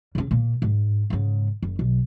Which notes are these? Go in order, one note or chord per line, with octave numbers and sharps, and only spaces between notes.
C#3 C#4
A#2 A#3
G#2
G#2 C#3
F#1
B1